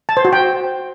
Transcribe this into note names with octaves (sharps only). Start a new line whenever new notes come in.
A5
C5
F#4
G5